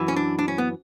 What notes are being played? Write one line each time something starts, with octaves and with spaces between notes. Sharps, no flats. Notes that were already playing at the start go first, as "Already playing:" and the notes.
Already playing: F#2 E3
C#4
D4
D4
C#4
B3